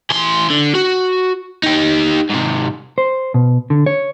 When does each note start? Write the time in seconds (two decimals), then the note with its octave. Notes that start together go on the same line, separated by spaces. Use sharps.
0.10 E3 C6
0.50 D3
0.75 F#4
1.64 D#4 G4
2.30 G#2 C3
2.98 C5
3.34 B2
3.70 D3
3.86 C#5